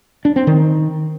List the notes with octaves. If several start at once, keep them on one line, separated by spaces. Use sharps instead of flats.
D4
C4
D#3